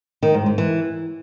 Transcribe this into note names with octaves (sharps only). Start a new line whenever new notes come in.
D#3
G#2
G#2
E3